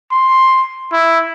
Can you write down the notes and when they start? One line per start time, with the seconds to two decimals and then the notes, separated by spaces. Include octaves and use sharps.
0.11 C6
0.92 E4